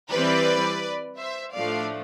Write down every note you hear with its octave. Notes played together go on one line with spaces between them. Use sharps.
E3 G3 C4 B4 D5
C5 E5
A2 F3 A3 D4 D5 F5